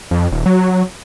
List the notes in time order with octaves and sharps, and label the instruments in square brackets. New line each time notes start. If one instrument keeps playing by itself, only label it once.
[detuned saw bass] F2
D#1
F#3